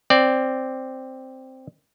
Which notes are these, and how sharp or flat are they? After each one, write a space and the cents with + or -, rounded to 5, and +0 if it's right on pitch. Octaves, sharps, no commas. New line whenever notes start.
C4 +0 D5 +0